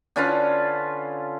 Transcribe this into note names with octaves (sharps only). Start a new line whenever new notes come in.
D3 C#4 F4 B4